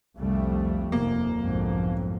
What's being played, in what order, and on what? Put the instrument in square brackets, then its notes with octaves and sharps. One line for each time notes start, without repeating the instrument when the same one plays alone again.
[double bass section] C2 G3 A3 [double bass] F2
[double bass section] F1 D#2 [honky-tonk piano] A#3
[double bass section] B1 G#2 D3 [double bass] F2